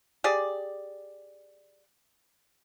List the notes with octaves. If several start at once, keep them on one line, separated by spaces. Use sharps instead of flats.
G4 G#4 D5